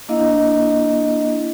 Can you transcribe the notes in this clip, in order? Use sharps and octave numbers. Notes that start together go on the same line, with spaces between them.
A#3 D4 E4 D#5 F5